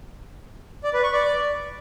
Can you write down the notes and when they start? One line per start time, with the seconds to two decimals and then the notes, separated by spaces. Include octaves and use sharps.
0.84 D5
0.93 B4
1.03 C#6
1.13 D5